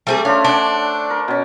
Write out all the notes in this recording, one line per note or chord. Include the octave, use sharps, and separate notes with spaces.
G3 A3 C4 G#4
C#4 D4 F4 C5
D4 F#5 D6
A#4
B2 C#4